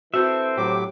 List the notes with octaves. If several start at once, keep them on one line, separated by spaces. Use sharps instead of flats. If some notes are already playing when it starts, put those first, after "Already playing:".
E3 C4 F#4 A4 E5
A2 F#3 G4 D6